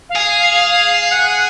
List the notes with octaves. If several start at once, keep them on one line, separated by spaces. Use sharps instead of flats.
F5
G#4
F#5